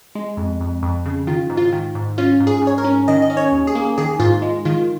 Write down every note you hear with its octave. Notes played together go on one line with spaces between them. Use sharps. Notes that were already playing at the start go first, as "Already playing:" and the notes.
G#3
F2
F2
F2
C#3
D#3 F4
G#2
F4
D#3
G#2
C#4 F4
G#2
G#4
G#2
C#5
A#4
C#4
D#3 D#5
D#5
C#4
C#5
D#2
G#4
A#3
D#3 G#4
G#2 F4
G#3
D#3 F4